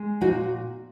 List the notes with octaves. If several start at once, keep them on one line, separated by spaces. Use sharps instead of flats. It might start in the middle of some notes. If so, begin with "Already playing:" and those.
Already playing: G#3
A#2 D#4 F#4